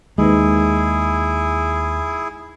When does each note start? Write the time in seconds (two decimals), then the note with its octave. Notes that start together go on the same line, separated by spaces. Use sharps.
0.18 D#2 G#3 D#4 E4 G#4 B4